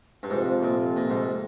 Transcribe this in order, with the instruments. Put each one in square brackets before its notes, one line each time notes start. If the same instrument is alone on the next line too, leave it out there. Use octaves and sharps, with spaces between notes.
[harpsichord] G2
[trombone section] F2 C3 F3 [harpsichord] G#2
[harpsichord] A#2
A#2
G#2